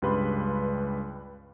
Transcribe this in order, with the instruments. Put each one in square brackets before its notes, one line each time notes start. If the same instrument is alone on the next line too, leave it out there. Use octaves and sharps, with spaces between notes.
[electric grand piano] C#2 G2 G3 B4 B5 C6